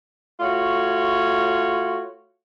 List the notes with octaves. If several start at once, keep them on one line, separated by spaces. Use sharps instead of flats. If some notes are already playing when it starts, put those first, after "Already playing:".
A3 F4 F#4 C#5